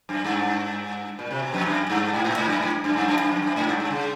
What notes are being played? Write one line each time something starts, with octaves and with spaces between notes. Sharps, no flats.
F#2
G2
A#2
C3
B2
F2
F#2
G2
G#2
A2
G#2
F#2
G#2
F#2
G2
F#2
F#2
F2
F#2
G#2
G2
G2
C#3